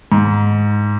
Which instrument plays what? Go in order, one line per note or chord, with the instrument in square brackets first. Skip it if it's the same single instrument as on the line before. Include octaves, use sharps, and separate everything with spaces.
[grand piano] G#2